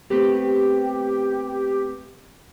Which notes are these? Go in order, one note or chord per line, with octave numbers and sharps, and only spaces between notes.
A3 B3 C4 G4